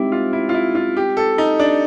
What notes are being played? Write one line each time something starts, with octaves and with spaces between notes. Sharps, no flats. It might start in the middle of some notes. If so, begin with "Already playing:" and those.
Already playing: G#3 C4 D#4 E4 G4
F4
E4
F4
E4
F4
G4
A4
D#4
D4